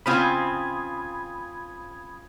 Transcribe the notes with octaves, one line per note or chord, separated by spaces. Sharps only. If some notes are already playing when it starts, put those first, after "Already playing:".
C#3 C4 F4 B5 D#6 G#6